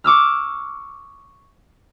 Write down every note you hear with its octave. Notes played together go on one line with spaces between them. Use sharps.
C#6 D6 E6 F6